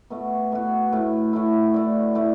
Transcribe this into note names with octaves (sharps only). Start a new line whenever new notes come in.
B2 A3 F#4
B2 A3 F#4
A2 A3 E4
A2 A3 E4
A3 E4 D5
A3 E4 D5